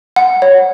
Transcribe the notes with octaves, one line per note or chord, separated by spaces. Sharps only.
F#5
C#5